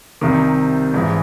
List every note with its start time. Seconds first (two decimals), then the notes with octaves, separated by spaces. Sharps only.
0.21 C2 C3 D#3
0.94 A#1 G#2 E3